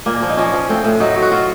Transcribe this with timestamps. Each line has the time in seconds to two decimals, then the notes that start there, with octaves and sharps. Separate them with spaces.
0.06 A#2 A#3
0.22 F3
0.29 D#4
0.37 F3 C#4
0.54 F3
0.69 A2 C4
0.84 A2
1.00 F#3 D#4
1.16 F#3
1.22 F#4
1.32 F#3 F4